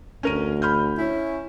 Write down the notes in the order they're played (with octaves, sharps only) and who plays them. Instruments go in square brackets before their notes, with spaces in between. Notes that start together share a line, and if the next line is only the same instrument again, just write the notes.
[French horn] D2 [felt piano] C#4 A#4 D#7
[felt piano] B5 F6 G6
[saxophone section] C#4 E4